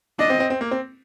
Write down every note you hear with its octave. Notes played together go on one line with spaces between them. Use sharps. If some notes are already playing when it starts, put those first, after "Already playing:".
D4 D#5
C4
C4
C4
A#3
C4